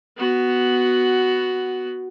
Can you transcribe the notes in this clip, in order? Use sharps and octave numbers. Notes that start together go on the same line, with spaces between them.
B3 F#4